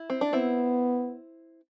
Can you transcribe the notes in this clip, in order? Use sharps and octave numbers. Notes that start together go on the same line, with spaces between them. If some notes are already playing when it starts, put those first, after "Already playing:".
Already playing: E4
C4
D4
B3 C4 E4